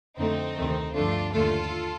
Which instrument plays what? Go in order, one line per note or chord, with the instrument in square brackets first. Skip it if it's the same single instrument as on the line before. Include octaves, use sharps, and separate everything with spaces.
[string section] F2 D3 A3 C4 D#4
D2 C3 D#3 A3
G2 D3 F3 A3 D4 F4
D#2 D3 A3 F4 A4